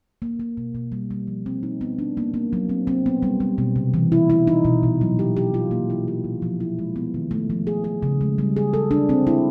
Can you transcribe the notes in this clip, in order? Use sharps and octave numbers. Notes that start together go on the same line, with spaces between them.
A#3
A#3
B2
B2
G3
G3
F3
C4
D#4
B3
D4
A#3
A#3
F#3
C4
C4
B3
G3
G3
B2
C3
E3
E4
E4
D#4
B2
A#2
F#3
G4
G4
F4
A#3
E4
G4
A#2
F3
E4
G#3
B3
D#3
A3
F3
G#4
G#4
C#3
G#3
G3
G#4
A4
D4
C4
E4